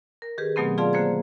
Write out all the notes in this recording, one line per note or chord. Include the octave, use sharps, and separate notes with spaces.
A#4
D#3 G4 G#4 B4
B2 D#3 F#3 A3 B3 C4
F4 G#4 D5 F5 A5 C6
D3 A#3 C5 G#6